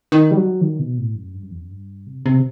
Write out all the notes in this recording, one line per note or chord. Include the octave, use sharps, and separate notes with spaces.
D#3
G3
F#3
D#3
B2
A2
F#2
G2
F#2
E2
F#2
G2
C3
C3